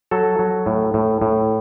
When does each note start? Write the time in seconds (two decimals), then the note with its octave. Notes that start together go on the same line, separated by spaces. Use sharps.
0.11 F#3 A4
0.39 F#3
0.66 A2
0.94 A2
1.22 A2